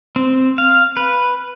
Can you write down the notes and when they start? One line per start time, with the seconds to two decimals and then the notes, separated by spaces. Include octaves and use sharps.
0.16 C4
0.58 F5
0.97 B4